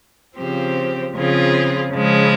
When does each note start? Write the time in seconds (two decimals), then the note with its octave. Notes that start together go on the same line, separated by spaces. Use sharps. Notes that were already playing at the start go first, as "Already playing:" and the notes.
0.37 C#3 F3 C4 G4 C5
1.15 C#3 F3 C4 F4 G#4
1.92 C#3 F3 G#3